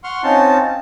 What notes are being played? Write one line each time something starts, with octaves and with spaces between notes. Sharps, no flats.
F#5 C6 C#6 F6
C4 C#4 D#4 F4 A5